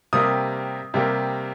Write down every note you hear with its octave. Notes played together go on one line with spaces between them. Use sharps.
C3 G3 A#3 D#6
C3 G3 A#3